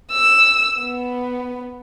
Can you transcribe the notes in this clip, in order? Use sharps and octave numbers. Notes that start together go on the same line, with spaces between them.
E6
B3